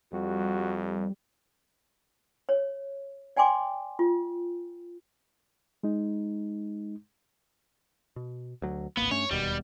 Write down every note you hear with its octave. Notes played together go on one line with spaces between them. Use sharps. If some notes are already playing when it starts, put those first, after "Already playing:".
F2 G3 F#4
C#5
D5 G5 G#5 C6 D6
F4
G#3 D#4
B2
D2 F#3
D1 G#1 A#3 B3
G2 A3 C#4 C#5
E1 D#2 B2 G3